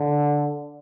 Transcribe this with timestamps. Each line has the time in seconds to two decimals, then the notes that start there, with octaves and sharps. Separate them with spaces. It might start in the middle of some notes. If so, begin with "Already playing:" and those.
Already playing: D3